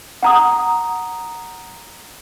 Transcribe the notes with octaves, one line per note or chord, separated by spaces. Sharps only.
F#5 A#5 D#6